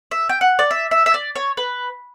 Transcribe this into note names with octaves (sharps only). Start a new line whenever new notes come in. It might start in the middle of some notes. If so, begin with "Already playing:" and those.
E5
G5
F#5
D5
E5
E5
E5
D5
C#5
B4